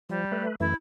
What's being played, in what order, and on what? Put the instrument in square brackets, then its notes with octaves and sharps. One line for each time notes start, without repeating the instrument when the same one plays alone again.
[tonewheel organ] F3 [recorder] G3
[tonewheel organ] A3 B4
[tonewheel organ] F#2 E3 A3 [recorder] E4